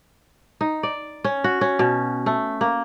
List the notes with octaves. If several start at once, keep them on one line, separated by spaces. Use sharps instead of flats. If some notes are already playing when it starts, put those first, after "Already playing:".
D#4
D5
C#4
F#4
C#4
B2
A3
A#3